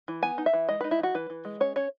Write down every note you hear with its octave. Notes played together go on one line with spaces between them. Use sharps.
E3
B3 G#5
D#4
E5
E3
G#3 D#5
D#4 B4
E4
E3 F#4
E3 B4
E3
G#3
C#4 C#5
C#4 C#5